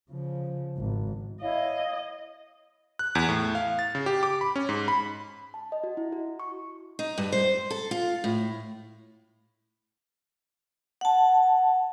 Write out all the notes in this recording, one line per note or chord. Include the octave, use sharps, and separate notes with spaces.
C#3 F3
G#1
E4 C#5 D#5 F5
F#6
E2
A2
F5
A6
C#3
G4
D6
B5
C#4
G#2
B5
A5
D#5
F#4
E4
F#4
C#6
D#4
G2
C5
A4
F4
A2
F#5 A5